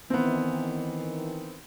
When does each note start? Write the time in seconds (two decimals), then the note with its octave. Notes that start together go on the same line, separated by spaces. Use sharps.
0.10 D#3 E3 B3 C4